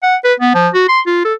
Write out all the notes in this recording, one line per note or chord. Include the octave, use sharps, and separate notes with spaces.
F#5
B4
B3
F3
F#4
C6
F4
A4